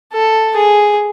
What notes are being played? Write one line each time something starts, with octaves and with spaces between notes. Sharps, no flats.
A4
G#4